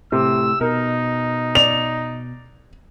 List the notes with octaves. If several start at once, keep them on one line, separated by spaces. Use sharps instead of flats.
A2 C3 E6
B2 D#4 A#4
D5 F7